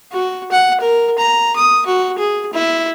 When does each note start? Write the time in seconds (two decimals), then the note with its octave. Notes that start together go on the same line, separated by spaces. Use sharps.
0.12 F#4
0.51 F#5
0.80 A#4
1.18 A#5
1.56 D#6
1.86 F#4
2.18 G#4
2.53 E4